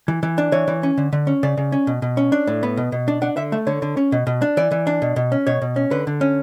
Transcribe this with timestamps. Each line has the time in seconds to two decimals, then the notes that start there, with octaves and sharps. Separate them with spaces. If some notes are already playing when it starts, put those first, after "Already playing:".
0.08 E3
0.23 E3
0.38 D4
0.52 E3 C#5
0.68 E3
0.83 C#4
0.97 D3
1.13 D3
1.27 C#4
1.43 C#3 D5
1.57 C#3
1.72 C#4
1.87 B2
2.02 B2
2.17 C#4
2.32 D4
2.47 A2
2.63 B3
2.77 B2
2.92 B2
3.08 D4
3.22 D4 F#5
3.37 D3 E5
3.52 A3 E5
3.67 D3 C#5
3.82 D3
3.97 C#4
4.12 B2
4.27 B2
4.42 D4
4.57 E3 D5
4.71 E3
4.87 D4
5.02 B2
5.16 B2
5.32 C#4
5.47 B2 C#5
5.62 B2
5.76 C#4
5.91 D3 B4
6.07 D3
6.21 C#4